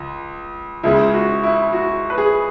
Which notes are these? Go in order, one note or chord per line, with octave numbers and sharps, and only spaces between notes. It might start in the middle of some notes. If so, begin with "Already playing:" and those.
Already playing: C#2
C#2 C#3 G#3 E4
F#4
E4
F#4
B4
G#4